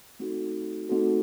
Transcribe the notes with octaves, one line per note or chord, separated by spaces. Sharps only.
A3 C4 D#4 F#4 A4
A3 C4 D#4 F#4 A4